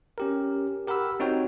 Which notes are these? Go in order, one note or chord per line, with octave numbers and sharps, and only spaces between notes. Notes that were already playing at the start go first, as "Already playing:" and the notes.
C#4 G4 A#4
G4 A#4 F#5 B5 E6
C4 D#4 F#4 C#5 G5